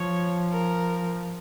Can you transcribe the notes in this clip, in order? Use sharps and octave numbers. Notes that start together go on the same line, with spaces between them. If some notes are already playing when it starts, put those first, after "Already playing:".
Already playing: F3 C#5
A#4